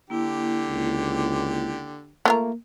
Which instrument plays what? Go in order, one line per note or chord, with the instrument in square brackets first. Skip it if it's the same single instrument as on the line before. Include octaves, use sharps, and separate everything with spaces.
[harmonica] D3 G4 [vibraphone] A#3 E4
[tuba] C#2
[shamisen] A3 F4 A#4 [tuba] A#3